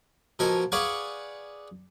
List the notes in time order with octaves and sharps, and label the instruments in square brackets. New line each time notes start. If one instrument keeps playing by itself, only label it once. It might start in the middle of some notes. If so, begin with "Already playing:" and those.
[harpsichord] B2 F3 A4 A#4 G#5
G#4 B4 D5 F5 F#5 C#6